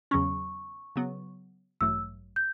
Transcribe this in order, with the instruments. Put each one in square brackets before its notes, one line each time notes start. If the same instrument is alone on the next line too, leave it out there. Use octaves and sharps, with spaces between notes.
[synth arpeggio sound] E2 C#3 F#3 C#4 [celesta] C#6
[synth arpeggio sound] C#3 F#3 B3
[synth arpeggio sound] A1 G2 F#3 A3 [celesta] E6
[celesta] G6